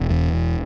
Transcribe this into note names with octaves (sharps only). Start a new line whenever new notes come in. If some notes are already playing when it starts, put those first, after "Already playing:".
Already playing: E1
E2
E1